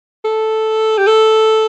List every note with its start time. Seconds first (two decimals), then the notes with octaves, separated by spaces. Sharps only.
0.25 A4
0.98 G4
1.07 A4